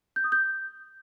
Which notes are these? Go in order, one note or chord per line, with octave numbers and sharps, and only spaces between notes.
G6
D#6
G6